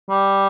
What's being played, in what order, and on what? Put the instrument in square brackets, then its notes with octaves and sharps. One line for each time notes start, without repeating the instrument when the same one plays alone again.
[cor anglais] G3